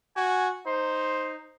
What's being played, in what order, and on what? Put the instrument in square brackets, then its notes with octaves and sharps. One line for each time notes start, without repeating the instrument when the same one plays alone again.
[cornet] F#4 [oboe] G#5
[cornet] D#4 [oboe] C5